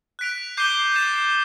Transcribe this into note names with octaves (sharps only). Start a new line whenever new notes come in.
F#6 B6 D7 F7
D6 G6 C7 D#7 G7
A6 C7 E7